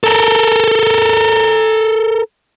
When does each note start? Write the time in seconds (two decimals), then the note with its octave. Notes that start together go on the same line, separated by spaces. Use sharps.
0.04 A4 A#4